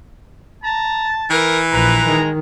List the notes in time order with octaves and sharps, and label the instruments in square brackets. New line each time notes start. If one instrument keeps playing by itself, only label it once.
[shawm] A5 [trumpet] A#5
[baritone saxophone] E3 [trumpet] A#4
[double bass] A#1 [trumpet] B4 [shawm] A#5
[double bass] D#3 [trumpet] G#3